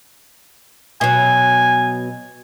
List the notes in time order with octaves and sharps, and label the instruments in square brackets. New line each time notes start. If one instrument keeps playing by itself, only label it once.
[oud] B2 F#3 [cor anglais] G#5